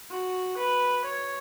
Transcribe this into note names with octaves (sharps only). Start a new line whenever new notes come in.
F#4
B4
C#5